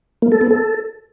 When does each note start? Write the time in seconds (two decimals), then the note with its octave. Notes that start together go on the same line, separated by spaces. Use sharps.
0.22 A#3
0.32 A4
0.41 B3
0.51 A4